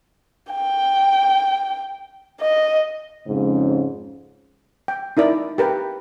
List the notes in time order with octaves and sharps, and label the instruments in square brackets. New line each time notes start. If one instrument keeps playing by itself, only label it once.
[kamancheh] G5
D#5
[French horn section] F2 G#2 C#3
[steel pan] G5
D#4 E4 A#4 D5
G4 A#4 B4 G5